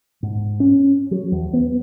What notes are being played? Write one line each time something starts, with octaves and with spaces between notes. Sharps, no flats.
G#2
C#4
F#3
E2
B3